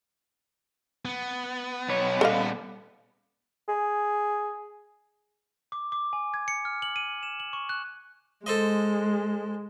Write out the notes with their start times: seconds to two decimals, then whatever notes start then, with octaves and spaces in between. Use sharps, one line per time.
1.05 B3
1.88 B1 C#5
2.21 A#2 G3 A4 D#5 F5
3.69 G#4
5.72 D6
5.92 D6
6.13 G#5
6.34 G#6
6.48 C#7
6.65 F6
6.82 F#7
6.96 D#7
7.23 E7
7.40 F#7
7.53 C#6
7.69 F#6
8.46 G#3 A4 C5 D#5